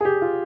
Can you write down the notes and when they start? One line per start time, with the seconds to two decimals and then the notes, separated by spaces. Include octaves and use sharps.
0.01 G#4
0.05 G4
0.22 F4